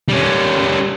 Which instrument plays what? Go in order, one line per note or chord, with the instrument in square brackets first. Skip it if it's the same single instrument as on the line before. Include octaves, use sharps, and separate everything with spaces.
[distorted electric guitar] G3 C#4